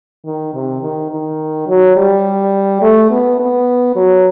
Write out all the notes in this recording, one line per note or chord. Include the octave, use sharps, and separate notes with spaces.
D#3
C3
D#3
D#3
F#3
G3
A3
B3
B3
F#3